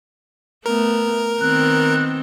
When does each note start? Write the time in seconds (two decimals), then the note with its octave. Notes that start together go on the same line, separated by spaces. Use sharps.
0.66 A3 B3 A#4
1.41 D#3 B3 C4 F#6